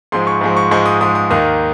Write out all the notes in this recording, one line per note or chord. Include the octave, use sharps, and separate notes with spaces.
G#2 F3 G#3 C6
C#6
G#2 F3 G#3
C#6
G#2 F3 G#3 C#6
D#6
G#2 F3 G#3 D#6
D#6
D#2 D#3 A#3 D#4 D#6